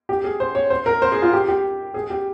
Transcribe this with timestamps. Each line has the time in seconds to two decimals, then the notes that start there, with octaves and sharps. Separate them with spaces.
0.09 G4
0.24 G#4
0.40 C5
0.55 C#5
0.70 C5
0.86 A#4
1.02 C5
1.12 G#4
1.22 F4
1.33 G4
1.48 G4
1.94 G#4
2.10 G4